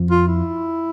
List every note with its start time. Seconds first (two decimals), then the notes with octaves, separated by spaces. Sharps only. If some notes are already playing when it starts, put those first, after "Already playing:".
Already playing: F2 F3
0.11 F4
0.28 E4